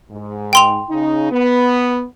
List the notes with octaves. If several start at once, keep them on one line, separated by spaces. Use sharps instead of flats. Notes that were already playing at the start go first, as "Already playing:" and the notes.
G#2
G5 C6 F7
C#3 D#4
B3